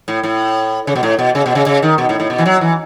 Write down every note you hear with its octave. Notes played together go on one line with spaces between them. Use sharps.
A2
A2
C#3
B2
A2
B2
C#3
B2
C#3
C#3
D#3
B2
A2
A2
B2
E3
F#3
E3